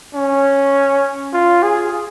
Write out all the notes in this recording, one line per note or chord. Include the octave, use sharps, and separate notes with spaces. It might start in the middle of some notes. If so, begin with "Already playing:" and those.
C#4
F4
G#4